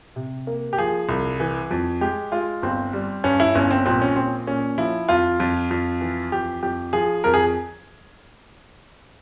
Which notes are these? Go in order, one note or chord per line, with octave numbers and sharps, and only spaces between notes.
C3
A#3
G4
F3 G#4
C2
E3
F2
G#3 G4
G#3 F4
G1 C4
G3
G2 C#4
E4
G1 C#4
C4
A#1 C4
C#4
A#1 C4
A#2 C#4
F3 E4
F2 F4
F2
F2
E3
F2 G4
F2 G4
F3 G#4
F2 A#4
G#4